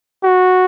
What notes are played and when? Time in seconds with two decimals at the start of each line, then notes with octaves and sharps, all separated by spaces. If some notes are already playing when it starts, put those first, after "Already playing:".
0.24 F#4